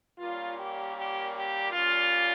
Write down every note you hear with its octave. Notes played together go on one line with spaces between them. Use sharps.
A#2 G3 A#3 C#4 F4
G4
G4
G4
A#2 G3 C#4 F4